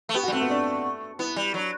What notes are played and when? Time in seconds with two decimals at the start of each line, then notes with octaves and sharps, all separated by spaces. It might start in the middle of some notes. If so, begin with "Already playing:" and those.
0.09 A3
0.14 B3 G4
0.23 F#4
0.28 G3
0.32 A3 C4
0.41 B3
0.50 D4
1.19 B3 E4
1.36 G3
1.54 F#3 D4